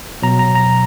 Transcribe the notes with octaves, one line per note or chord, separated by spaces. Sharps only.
B2 F#3 A#5
A#5
A#5